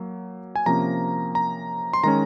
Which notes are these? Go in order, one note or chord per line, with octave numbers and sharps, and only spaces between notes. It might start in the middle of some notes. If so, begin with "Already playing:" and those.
Already playing: F#3 A#3
G#5
C3 F3 A#3 C#4 A#5
A#5
C6
D#3 G#3 C#4 A#5